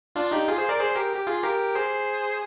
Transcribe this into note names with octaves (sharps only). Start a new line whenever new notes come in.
D4 F4
D#4 G4
F4 G#4
G#4 C5
A#4 D5
G#4 C5
G4 A#4
G4
F4 G#4
G4 A#4
G#4 C5